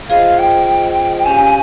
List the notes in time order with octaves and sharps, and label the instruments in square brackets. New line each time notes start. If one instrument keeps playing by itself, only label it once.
[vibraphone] F4 G#4 C5 D#5 [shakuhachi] F5
[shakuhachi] G5
[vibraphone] C#4 G4 C#5 F5 [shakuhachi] G#5